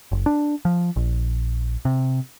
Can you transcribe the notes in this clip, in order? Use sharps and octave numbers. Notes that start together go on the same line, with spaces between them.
F#1
D4
F3
A#1
C3